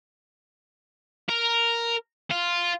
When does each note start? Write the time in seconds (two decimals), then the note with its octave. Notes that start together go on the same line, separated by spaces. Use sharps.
1.29 A#4
2.31 F4